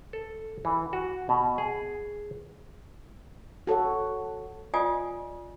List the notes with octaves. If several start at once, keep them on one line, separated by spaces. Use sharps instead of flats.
A4
E3
F#4
B2
G#4
F#4 A4 C#5 F#5
F4 D5 D#5 G#5 D#6